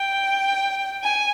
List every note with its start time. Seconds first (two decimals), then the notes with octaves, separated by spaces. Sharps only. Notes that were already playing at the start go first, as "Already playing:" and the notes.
Already playing: G5
1.03 G#5